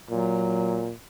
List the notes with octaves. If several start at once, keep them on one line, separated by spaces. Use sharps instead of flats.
A#2 F#3